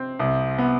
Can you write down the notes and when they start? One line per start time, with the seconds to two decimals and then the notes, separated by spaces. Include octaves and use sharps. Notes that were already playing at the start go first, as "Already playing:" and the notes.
Already playing: C3 C4
0.19 C2
0.58 B3